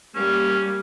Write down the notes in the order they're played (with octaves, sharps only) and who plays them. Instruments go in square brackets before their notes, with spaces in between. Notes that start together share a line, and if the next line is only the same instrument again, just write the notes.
[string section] G3 A#3 [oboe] C#4